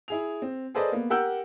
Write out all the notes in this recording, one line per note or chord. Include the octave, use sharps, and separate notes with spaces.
E4 G#4 F7
C4
G#4 A4 B4 C5 D5 D#5
A#3 B3
G4 A#4 F#5 E6 G6